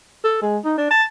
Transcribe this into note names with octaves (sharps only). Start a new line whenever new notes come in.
A4
G#3
D#4
D4
A5